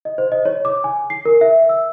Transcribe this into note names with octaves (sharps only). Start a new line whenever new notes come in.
D#5
C5
D#5
C#5
D6
G#5
C7
A#4
E5
E6